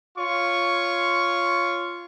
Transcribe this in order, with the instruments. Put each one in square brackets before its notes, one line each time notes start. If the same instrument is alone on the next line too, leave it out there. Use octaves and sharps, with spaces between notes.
[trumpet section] F4 C#5 C#6